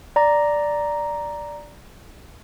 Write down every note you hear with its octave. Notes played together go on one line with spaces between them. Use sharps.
D5 A#5